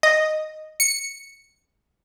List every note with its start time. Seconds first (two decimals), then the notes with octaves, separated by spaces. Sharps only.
0.03 D#5
0.80 C#7